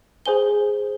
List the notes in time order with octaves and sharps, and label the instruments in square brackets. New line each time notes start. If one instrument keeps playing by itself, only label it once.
[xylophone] G#4 C5 G#5 G7